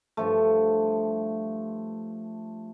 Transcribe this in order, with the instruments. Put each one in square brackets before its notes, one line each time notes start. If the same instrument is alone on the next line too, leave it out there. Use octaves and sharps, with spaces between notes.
[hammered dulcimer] G2 F3 A3